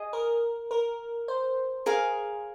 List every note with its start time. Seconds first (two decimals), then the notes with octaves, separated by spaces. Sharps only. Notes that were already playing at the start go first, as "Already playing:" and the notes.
Already playing: G#4 D#5
0.13 A#4
0.71 A#4
1.28 C5
1.86 G#4 A#4 F5 G#5